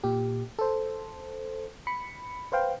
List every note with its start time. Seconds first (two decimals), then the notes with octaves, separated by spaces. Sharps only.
0.04 A#2 G4
0.59 A4 C5
1.87 B5 C#7
2.52 B4 C5 F5 G5